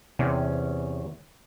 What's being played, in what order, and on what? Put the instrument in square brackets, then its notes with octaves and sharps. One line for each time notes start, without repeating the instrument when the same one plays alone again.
[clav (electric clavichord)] E2 C#4 [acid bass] C3